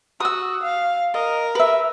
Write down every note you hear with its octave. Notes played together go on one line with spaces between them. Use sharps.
F#4 D#6 E6
F5
A#4 D#5
B4 E5